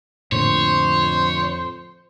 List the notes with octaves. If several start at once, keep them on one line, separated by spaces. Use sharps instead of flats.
F2 A2 D3 A#3 C5 C#5